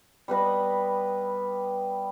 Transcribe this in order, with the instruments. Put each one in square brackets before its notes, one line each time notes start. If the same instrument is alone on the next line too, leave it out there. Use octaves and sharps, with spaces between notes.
[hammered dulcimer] G3 B3 B4 D#5